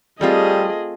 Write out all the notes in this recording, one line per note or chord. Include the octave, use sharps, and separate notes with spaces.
G3 A3 C4 F4 G#4 D#5